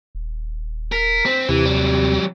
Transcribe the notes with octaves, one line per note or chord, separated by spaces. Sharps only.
D#1
A#4 B6
C4
D#2 C3 E3
F#3 G3